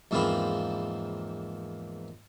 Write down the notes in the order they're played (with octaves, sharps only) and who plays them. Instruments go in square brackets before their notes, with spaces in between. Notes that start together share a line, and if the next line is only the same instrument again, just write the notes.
[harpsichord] E2 G#2 F3 A#3 C4 B5